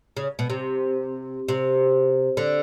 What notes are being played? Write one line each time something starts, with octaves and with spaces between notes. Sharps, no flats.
C#3
B2
C3
C3
D3